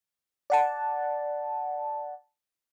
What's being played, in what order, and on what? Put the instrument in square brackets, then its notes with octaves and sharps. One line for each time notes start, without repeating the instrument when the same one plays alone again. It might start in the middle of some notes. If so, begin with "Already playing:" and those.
[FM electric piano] D5 F#5 A5